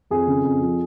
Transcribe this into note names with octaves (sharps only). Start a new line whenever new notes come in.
F2 G#4
C#3
F2
F3